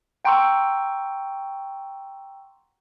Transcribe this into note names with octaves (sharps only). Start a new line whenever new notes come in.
F#5 G5 A#5 C6 C#6 E6